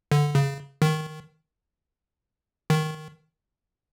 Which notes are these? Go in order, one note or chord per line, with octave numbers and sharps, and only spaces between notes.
D3
C#3
D#3
D#3